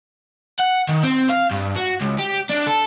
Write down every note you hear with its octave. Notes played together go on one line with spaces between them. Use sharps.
F#5
D#3
C4
F5
G2
F#4
C#2
G4
D4
A4